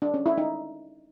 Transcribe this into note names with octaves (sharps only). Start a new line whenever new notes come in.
D4
C#4
E4
D#4